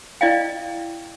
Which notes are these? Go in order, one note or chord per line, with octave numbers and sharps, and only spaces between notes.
E4 D5 D#5 F5 G5